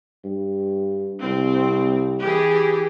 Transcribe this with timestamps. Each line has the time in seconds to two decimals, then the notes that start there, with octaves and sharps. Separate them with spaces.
0.24 G2
1.23 C2 C4
2.19 E3 G4 G#4